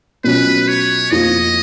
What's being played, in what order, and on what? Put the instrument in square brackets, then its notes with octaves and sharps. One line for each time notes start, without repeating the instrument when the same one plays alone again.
[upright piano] B2 F#3 C#4 F4 [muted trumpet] B4
[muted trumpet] C#5
[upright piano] F2 F3 A#3 [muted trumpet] D#5